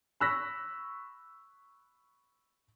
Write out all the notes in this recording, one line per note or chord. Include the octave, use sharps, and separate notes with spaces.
B5 C#6 E6 F#6 A#6 B6